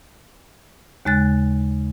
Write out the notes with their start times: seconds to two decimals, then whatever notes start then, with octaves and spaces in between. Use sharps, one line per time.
1.05 D#2 C#3 G#3 F#6 A6